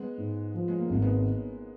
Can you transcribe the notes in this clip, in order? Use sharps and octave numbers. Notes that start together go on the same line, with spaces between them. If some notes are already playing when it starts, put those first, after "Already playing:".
Already playing: G#3 B3
G#2
F3
G#3
A#3
G#1 A#3
G#3 B3